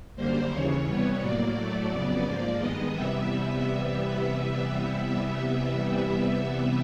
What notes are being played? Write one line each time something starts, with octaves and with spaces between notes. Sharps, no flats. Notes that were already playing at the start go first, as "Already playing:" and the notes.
F#2 D3 G3 A#3 C5
D#2 C#3 E3 C#5
C3 E3 G3 B3
A2 F#3 A#3 D5
A2 F#3 A3
F2 C#3 F#3 B3 D5
G#2 F3 A#3
G2 D#3 G#3 B3 D#5
C3 E3 G3 B3 E5